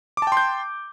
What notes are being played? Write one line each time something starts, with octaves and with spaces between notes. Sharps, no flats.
G5 A5 C6 D6 G6